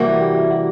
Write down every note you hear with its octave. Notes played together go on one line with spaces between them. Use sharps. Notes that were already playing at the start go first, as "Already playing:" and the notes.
Already playing: C3 E3 G3 A#3 F#4
G4
F#4